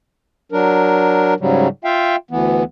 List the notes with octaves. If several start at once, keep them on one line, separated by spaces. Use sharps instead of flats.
F#3 D4 A#4
G#2 C#3 F#3 G3
F4 E5 F5 G5
D2 E3 B3